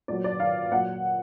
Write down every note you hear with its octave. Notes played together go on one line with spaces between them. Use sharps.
A#2 F#3 D5
D5
F5
A#2 F#3 F#5